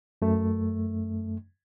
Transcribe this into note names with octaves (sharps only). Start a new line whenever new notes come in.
F#2 A3